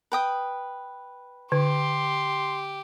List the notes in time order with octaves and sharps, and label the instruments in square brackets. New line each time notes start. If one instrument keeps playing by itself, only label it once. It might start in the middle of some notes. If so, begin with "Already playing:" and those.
[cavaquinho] B4 G5 D#6
[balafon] D3 [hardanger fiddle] G4 [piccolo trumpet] C6